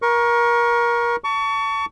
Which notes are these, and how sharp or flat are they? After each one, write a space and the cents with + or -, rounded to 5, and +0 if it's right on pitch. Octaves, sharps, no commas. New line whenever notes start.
A#4 +25 C#6 +0
A5 +25 C#6 +30